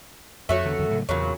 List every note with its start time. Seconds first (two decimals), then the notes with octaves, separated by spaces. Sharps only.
0.49 F2 A3 F#4 C#5
0.65 E2 D3 E3
0.79 F2 D3 D#3
0.91 A2 C#3 F#3
1.09 E2 A#2 C#3 F#3